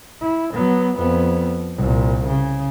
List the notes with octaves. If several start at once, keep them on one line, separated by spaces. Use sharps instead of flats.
E4
F#3 B3
F2 B3
C2 A#2
C#3